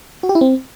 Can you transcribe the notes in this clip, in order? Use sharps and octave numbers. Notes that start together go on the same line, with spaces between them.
F#4
G4
E4
C4